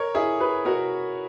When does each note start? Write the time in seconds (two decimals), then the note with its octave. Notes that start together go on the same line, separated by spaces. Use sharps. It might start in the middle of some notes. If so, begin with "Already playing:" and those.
Already playing: A#4 C#5
0.14 E4 G#4
0.40 G#4 B4
0.65 F#4 A#4